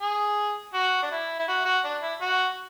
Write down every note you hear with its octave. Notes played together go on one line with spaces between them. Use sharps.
G#4
F#4
D4
E4
E4
F#4
F#4
D4
E4
F#4